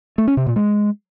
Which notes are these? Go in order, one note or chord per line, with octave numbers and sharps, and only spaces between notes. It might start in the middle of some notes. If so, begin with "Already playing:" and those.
A3
C#4
C3
A#2
G#3